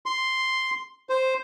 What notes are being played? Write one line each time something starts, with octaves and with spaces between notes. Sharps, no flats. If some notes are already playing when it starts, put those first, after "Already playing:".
C6
C5